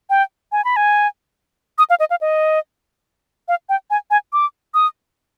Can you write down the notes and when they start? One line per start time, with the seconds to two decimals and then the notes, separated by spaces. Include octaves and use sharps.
0.10 G5
0.52 G#5
0.65 B5
0.76 G#5
1.78 D#6
1.90 F5
2.00 D#5
2.10 F5
2.21 D#5
3.48 F5
3.69 G5
3.90 G#5
4.11 G#5
4.33 D6
4.74 D#6